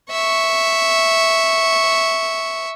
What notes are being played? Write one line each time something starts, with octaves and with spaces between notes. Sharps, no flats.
E5 C#6